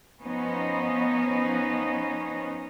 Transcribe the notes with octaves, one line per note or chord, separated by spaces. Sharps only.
F3 B3 C#4 D#4 D#5